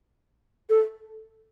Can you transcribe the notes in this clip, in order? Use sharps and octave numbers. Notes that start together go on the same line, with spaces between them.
A4